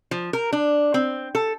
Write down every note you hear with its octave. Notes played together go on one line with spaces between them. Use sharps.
F3
A#4
D4
C4
A4